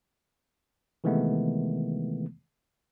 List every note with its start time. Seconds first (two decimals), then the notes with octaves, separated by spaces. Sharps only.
1.04 C3 D#3 E3 G#3 A3 B3